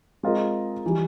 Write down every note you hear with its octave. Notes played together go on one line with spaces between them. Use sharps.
G#3 C4 F4 A#4 D#5
E3 G3